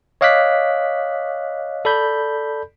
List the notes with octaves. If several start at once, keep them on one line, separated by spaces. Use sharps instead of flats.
C#5 D#5 F5 D6 F#6 B6
A4 D5 B5 G6